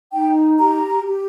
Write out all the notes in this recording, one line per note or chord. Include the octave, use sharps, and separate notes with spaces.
D#4 G5
G4 A#5
G4